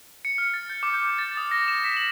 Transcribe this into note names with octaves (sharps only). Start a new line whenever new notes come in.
C#7
F6
A6
G6
D6
G6
A6
D#6
A#6
E7
B6
F#7